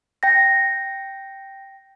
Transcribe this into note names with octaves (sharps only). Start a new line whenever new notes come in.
G5 A#6